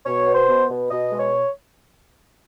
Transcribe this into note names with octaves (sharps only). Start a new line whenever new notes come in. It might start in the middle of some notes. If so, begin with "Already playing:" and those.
B2 C#5
B3
C5
B2
B2
B2 D#5
G#3
C#5